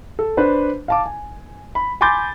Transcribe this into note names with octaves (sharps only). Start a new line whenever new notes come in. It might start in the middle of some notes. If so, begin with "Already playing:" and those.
A4
D4 B4 C5
F5 A5 D6
G#5
B5
G#5 B5 C6 D6 G6 A6